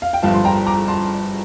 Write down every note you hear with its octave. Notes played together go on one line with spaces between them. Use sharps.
F5
G5
G1 G2 F3 F5 A5
C6
G5 A#5
A#5 D6
A5 C6